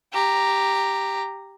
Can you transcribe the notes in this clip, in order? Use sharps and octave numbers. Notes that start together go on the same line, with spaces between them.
G4 A#5